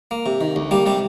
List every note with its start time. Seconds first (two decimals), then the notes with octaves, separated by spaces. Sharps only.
0.11 A#3
0.26 C3
0.41 D#3
0.56 D2
0.71 G3 A#3 G4
0.86 C3 G3 G4